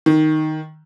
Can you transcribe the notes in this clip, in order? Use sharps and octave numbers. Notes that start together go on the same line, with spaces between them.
D#3